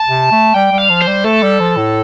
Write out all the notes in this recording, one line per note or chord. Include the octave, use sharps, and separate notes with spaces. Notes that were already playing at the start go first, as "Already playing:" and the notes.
Already playing: A5
C3
A3
G3 G5
G3
F5
F3
C5
G3
A3 A4
G3
F3
A2